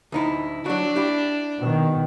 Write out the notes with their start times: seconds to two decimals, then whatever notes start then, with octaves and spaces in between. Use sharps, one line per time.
0.12 D2 D#4 E4
0.66 F#3 D4 F#4
0.96 E4 G4
1.58 B2 D#3